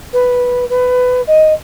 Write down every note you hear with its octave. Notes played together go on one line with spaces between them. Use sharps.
B4
B4
D#5